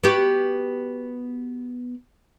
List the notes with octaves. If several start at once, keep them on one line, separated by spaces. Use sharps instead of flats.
B3 F#4 G4